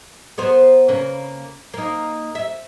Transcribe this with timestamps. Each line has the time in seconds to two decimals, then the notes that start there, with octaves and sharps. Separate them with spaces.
0.38 B3 A#4 C5
0.88 C#3 A#3 B4
1.74 A#3 D#4
2.35 E5